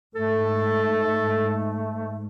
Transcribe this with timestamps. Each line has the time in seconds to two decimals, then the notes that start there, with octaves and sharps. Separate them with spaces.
0.15 G#2 A3 A4